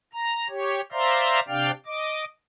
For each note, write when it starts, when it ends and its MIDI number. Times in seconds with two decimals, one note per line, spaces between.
0.13 0.47 82
0.49 0.81 67
0.49 0.81 73
0.92 1.40 72
0.92 1.40 74
0.92 1.40 76
0.92 1.40 77
0.92 1.40 82
0.92 1.40 84
1.48 1.71 48
1.48 1.71 62
1.48 1.71 74
1.48 1.71 77
1.48 1.71 79
1.48 1.71 89
1.86 2.24 75
1.86 2.24 86